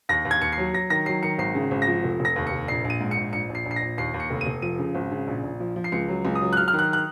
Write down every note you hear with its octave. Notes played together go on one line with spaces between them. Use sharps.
D#2 A#6
D#2
G#6
D#2 C#7
C7
F#3
F#3 A#6
D#3 A#6
F#3 C7
D#3 C#7
G#1 C7
C#3
G#1
A#6
F3
F1
F1
A#6
D#2
C#7
F1
A#1 C7
A#1
D#7
G#2
C#7
A#1
A#1 C#7
A#1
C7
A#1
C7
A#6
A#1
D#2 C7
D#2
C#7
F1
D#7
F1
F3 D#7
C#3
G#1
C#3
A#1
A#1
F3
F3
C7
C#2 C#7
F#3
C#2
D#6
F#3
F#6
F#3 F6
F6
D#3
F#6
F#6